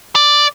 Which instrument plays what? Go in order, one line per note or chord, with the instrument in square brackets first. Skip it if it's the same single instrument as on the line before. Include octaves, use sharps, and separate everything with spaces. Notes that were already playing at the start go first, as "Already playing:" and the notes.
[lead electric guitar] D5